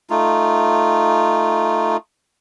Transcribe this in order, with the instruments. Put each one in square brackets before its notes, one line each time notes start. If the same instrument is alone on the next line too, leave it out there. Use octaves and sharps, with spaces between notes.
[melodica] A3 D#4 F4